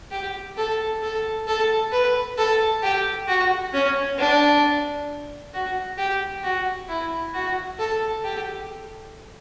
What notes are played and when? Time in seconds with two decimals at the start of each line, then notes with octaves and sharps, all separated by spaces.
0.11 G4
0.57 A4
1.02 A4
1.47 A4
1.92 B4
2.37 A4
2.83 G4
3.28 F#4
3.73 C#4
4.18 D4
5.54 F#4
5.98 G4
6.44 F#4
6.89 E4
7.34 F#4
7.79 A4
8.24 G4